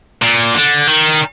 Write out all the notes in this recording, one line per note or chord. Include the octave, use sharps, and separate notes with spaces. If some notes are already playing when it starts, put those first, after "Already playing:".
A#2
D3
D#3